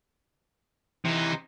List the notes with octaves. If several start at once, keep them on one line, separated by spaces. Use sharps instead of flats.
C3 E3 D#4